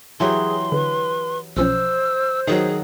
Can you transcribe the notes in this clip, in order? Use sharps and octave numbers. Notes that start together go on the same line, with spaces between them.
E3 F#3 G4 G#4 C6
D3 B4
B1 F3 C#4 C5 E6
D#3 F#3 G#4